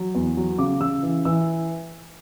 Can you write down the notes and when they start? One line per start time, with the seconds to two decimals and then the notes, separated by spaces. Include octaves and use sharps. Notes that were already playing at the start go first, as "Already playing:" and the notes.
Already playing: F#3
0.15 E2
0.37 F#3
0.58 C#3 D6
0.81 C#3 E6
1.03 E3
1.25 E3 E6